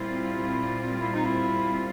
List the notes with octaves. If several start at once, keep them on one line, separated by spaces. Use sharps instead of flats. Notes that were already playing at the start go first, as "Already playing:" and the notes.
Already playing: A#2 G3 C4 E4 F4
E4
D#4
E4